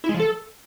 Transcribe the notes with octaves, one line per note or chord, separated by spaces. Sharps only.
E4
G#3
F3
A4